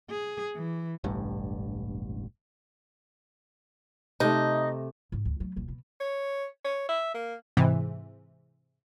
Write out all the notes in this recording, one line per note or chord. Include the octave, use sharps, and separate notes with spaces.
G#4
E3
E1 A1 G2
C3 A3 D#4
G#2
D2
F#3 A3
D#1 B1
B2
C#5
C#5
E5
A#3
G#2 C3 E3